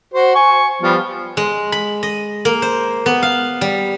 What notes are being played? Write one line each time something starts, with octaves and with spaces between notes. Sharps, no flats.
F#4 C5
G#5 C#6
F3 G3 B3
G#3
B5
D#5
A#3
C5
B3
F5
G3